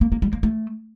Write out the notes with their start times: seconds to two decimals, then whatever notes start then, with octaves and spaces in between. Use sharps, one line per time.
0.01 A#3
0.12 A#3
0.22 G3
0.33 A#3
0.43 A3